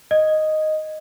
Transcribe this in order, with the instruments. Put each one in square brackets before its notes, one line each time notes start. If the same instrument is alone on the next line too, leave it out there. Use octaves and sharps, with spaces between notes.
[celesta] D#5